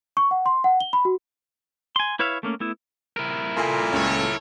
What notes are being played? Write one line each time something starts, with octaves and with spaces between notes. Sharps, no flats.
C#6
F#5
C6
F#5
G7
B5
F#4
G#5 C6
E4 B4 C#5 E5 F5
A3 A#3 C#4
A3 B3 E4
E4 A#4
A#2 A4 G#5 C6
C#2 A4 C#5